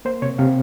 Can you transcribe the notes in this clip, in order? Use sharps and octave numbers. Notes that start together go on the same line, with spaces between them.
A#3 C5
C3 C#5
C3 F5